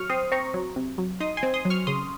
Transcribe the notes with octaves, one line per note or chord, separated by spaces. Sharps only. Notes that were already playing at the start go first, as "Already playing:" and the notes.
Already playing: F#3 C#6 F6
C4 C6 D#6
C4 A#5 C#6
F#3
C3
F#3
D#4 C6 D#6
G#5 C6
C4
C6 D#6
F#3
C#6 F6
C#3 C6 D#6